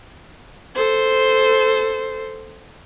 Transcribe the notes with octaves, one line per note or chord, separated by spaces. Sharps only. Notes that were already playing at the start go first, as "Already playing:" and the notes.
A4 C5